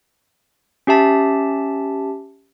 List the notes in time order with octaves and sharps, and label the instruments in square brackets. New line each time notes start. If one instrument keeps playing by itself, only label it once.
[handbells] C#4 G4 E5 A5